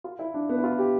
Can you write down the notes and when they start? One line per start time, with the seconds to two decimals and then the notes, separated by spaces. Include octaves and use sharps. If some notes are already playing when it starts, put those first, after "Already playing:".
0.04 F4
0.19 E4
0.34 D4
0.49 B3
0.58 E4
0.64 F4
0.78 G4